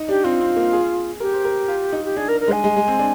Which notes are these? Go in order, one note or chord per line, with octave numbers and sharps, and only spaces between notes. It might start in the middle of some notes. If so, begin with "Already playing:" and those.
Already playing: D#4
D4 G4
C4 F4
C4
A#3
G#4
G4 A#4
C5
A#4
F4
D#4
G4
D4 G#4
A#4
A#4
G#3 G#5
G#3
G#3
C4
D4